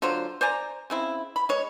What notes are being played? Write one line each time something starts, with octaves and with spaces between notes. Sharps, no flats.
D3 F#3 F4 C5
C5 D5 G#5 A#5
C#3 C4 E4
B5
G#3 C#5